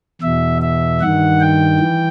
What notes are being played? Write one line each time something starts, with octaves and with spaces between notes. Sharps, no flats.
E2 B2 E5
E5
G2 D#3 F#5
G5
E3